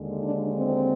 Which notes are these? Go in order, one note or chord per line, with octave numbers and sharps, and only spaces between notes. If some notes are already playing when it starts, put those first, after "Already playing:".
Already playing: D#2 D3 G#3
D4
C4